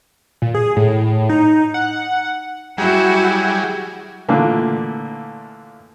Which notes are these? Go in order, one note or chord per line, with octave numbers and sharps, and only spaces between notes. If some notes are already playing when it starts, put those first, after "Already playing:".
A#2
G#4
A2
D#4
F#5
F#3 G3 E4 F#4 G#4
A#2 D3 E3 F3 A3 A#3